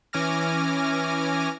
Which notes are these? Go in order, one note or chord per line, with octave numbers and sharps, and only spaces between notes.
E3 C#4 G#5 D6 F6 A#6